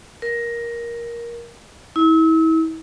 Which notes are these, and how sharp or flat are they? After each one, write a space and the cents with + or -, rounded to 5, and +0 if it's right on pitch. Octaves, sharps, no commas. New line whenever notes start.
A#4 +10
E4 -35